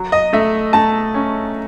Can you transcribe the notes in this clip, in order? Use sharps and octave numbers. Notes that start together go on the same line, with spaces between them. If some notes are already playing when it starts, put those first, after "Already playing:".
Already playing: F#3
D#5
A3 E5
A3 A5
C#4